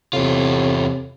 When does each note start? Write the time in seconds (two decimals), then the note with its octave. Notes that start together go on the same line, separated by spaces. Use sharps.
0.13 E2 A2 C3 F4